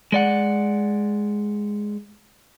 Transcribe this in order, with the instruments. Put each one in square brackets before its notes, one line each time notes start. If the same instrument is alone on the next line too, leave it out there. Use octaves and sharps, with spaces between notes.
[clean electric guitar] G#3 D5 F#5